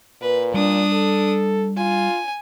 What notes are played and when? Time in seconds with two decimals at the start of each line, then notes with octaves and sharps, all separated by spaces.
0.21 A#2 B4
0.54 G3 D4 D#6
0.93 A4
1.77 F4 G#5